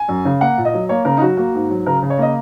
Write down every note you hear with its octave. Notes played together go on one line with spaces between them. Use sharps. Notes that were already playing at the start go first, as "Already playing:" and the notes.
Already playing: G#5
F#2
C#3
A#3 F#5
A#2
D#5
F#3
A#3 C#5
C#3 A#4
D#4
F#3 F#4
A#3 F#4
G#2
F#3
C#3 A#4
C#3
C#5
A#3 D#5